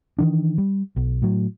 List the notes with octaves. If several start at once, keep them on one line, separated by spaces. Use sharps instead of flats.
D#3 E3 D4
G3
B1
A2 F#3